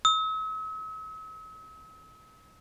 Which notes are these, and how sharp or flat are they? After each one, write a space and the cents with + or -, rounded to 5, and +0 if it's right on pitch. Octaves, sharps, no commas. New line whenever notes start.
E6 -45